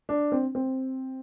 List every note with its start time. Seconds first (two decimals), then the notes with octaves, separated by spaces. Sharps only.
0.09 D4
0.32 C4
0.55 C4